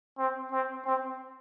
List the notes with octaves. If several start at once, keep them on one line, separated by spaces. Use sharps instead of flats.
C4
C4
C4